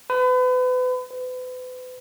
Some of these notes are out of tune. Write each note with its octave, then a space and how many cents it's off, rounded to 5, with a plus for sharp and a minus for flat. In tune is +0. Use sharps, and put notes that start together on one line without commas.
B4 +35
B4 +40